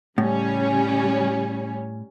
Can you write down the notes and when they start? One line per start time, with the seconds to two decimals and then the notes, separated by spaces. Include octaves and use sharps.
0.18 A2 C#3 G3 C#4